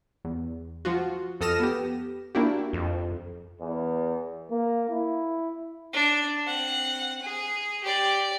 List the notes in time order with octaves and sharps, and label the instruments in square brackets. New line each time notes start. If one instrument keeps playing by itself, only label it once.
[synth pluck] E2
F3 F4 F#4
F2 A4 D#6 F6 A#6 E7
B3 G4
A#3 D4 E4 F#4 G4
[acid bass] F2
[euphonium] E2
A#3
E4
[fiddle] D4
C4 F#5
G#4
G4 D5